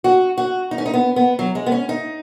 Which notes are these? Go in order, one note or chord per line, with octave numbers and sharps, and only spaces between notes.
F#4
F#4
D#4
C#4
D#4
B3
B3
F#3
G#3
B3
C#4
D#4